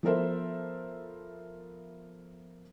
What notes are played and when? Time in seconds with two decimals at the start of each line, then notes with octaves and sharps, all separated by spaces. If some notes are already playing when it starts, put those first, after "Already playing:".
0.03 F3 B3 A4 A#4 C5 E5